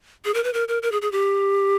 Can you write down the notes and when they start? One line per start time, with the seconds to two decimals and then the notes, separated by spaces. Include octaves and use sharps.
0.25 G#4
0.34 A#4
0.44 B4
0.54 A#4
0.68 A#4
0.82 A#4
0.92 G#4
1.02 G#4
1.12 G4